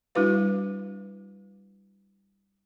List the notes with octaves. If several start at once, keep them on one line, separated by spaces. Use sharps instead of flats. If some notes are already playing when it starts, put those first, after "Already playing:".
G3 D4 E4 F#4 B4 F5